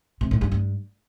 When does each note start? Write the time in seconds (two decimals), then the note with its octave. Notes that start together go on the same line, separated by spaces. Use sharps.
0.21 C3
0.31 A2
0.41 G2
0.52 G2